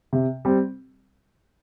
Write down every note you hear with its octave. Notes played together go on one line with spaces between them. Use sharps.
C3
G3 C4